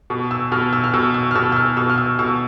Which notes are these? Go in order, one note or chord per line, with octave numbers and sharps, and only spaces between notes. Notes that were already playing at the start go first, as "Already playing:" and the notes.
B2
E6
B2 F6
E6
F6
B2 E6
E6
F6
B2 E6
E6
F6
B2 E6
F6
E6
B2 E6